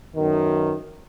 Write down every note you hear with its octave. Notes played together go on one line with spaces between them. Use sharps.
F#2 B2 D#3